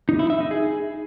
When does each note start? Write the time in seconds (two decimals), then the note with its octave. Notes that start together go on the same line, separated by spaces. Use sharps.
0.09 D#4
0.19 E4
0.30 E5
0.40 D#4
0.51 G#4